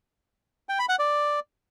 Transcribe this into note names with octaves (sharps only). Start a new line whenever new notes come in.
G5
B5
F#5
D5